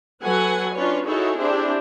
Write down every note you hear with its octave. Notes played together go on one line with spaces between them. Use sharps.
F#3 A4 B4 F#5 G#5
C#4 D4 F4 B4 C#5
D#4 E4 F#4 G#4 A4 C#5
C4 D4 E4 G4 G#4 C5